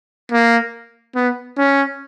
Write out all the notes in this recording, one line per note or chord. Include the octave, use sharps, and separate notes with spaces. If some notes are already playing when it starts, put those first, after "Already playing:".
A#3
B3
C#4